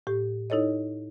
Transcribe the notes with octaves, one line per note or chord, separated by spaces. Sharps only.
A2 G4
D#4 E4 A4 C#5 D#5